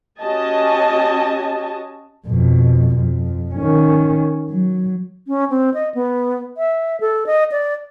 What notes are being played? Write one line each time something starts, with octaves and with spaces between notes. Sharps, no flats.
C#4 F#4 G4 D#5 G#5 A5
F2 B2
F2
D#3 C#4
F#3
C#4
C4
D#5
B3
E5
A4
D#5
D5